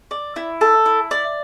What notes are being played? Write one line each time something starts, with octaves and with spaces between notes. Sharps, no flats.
D5
E4
A4
E4
D5